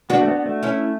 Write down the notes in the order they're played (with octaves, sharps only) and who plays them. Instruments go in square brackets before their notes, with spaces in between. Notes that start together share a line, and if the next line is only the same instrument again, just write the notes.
[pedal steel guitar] B3 [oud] D4 F#4
[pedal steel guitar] A3
B3
A3
[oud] C#4 E4